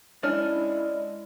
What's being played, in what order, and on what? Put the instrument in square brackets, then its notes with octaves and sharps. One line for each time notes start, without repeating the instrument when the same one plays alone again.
[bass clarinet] G#3 [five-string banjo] C#4 D4 [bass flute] E4 [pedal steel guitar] D5 F6